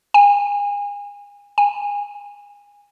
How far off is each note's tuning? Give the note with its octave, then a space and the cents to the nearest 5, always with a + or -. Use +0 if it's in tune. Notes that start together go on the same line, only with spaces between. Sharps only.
G#5 -35
G#5 -25